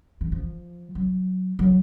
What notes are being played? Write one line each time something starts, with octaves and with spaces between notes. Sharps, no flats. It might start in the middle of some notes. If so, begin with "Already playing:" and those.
E3
F3
F#3
F#3